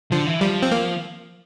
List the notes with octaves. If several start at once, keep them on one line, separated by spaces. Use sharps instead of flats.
D3 F3
E3
F3 G3
C4
A#3